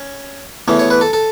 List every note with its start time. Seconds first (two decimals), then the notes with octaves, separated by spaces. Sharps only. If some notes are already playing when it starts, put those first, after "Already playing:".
Already playing: C#4
0.68 E2 E3 A3 C#4
0.79 C#5
0.90 B4
1.01 A4
1.13 A4